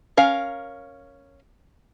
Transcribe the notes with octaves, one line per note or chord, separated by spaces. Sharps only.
C#4 A#4 F5